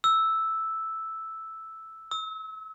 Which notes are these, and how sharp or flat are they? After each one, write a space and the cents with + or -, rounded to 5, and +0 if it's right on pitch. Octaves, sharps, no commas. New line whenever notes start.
E6 -5
E6 -35